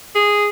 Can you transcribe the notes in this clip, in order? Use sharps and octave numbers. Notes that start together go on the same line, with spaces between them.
G#4